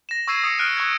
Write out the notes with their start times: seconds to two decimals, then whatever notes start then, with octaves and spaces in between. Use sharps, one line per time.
0.09 A#6 E7
0.28 C#6 E6 G#6 C7 D#7 E7
0.44 D#6 A#6 C#7
0.58 F6 F#6 D7 D#7
0.77 C#6 F#6 G#6